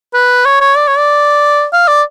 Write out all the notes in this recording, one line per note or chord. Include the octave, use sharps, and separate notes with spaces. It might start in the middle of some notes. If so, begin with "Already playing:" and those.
B4
C#5
C#5
D5
C#5
D5
F5
D5